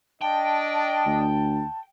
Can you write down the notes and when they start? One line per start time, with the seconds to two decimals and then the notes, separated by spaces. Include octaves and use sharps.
0.21 D4 D#5 G5 A5
1.06 D2